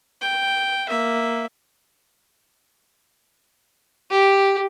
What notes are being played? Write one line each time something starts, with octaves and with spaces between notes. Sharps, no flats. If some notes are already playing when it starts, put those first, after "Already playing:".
G5
A#3 E5
G4